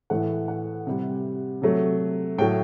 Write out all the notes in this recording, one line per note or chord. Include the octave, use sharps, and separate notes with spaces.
A2 E3 A3 F#5
F#5
C3 G3
C3 F#3 A3
A2 F#3 A3 G5